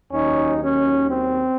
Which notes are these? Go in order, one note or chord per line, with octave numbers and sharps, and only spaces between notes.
D#2 D#3 F#3 C#4 D#4
C#4
C4